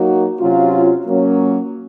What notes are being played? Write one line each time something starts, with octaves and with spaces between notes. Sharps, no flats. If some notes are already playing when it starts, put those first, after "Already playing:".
Already playing: F#3 A#3 D#4 F#4
C3 F#3 C#4 F4
F#3 A#3 C#4